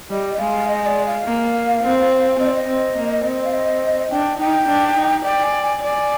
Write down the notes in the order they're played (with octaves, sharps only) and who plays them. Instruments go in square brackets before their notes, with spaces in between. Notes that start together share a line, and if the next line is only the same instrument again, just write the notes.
[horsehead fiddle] G3 [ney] D#5
[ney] D#5
[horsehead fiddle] G#3 [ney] F5
[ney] D#5
D5
F5
[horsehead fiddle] A#3
C4
[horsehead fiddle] C4 [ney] D#5
[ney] D5
D#5
[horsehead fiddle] C4
A#3
C4
[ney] F5
D#5
[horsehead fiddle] D4 [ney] G5
[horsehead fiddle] D#4 [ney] G5
[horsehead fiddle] D4
D#4
[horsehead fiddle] D5 [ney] G5
[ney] G#5
G#5
[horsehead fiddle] D5 [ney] G#5